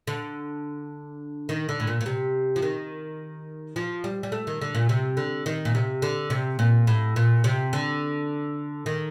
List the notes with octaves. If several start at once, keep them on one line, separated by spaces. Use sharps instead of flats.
D3
D#3
D3
A2
A#2
A#2
C3
F3
D#3
F3
G3
G3
A3
D#3
D3
A#2
C3
D3
D#3
A#2
C3
D3
C3
A#2
A2
A#2
C3
D3
D#3